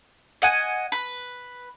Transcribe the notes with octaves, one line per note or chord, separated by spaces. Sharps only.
D#5 F#5 G#5
B4